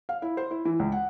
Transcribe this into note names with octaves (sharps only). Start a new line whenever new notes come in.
F5
E4
C5
E4
E3
C#2
F#5